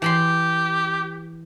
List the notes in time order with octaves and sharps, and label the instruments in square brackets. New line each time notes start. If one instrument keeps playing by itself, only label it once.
[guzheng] E3 B5 C6 [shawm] G4